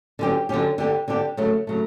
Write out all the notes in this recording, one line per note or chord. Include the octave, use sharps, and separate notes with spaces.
D3 F#3 C#4 G4
D3 F#3 C#4 G4
D3 G3 D4 G4
D3 G3 D4 G4
C#3 F#3 A3
C#3 F#3 A3